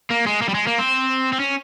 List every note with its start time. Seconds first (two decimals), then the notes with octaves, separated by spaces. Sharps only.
0.11 A#3
0.27 G#3
0.42 A#3
0.48 G3
0.54 G#3
0.67 A#3
0.78 C4
1.33 C4
1.40 C#4